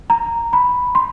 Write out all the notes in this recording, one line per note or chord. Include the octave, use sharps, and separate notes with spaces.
A#5
B5
C6